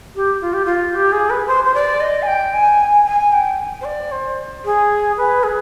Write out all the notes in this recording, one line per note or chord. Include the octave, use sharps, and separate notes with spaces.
G4
F4
G4
F4
G4
G#4
B4
C5
C5
D5
D#5
G#5
G5
G#5
G#5
G5
C5
D5
C5
G#4
B4
G#4